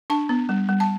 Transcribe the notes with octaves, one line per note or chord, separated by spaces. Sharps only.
D4 A5
B3
G3
G3
A5